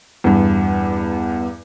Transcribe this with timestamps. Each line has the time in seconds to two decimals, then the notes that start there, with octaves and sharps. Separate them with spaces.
0.24 E2 G2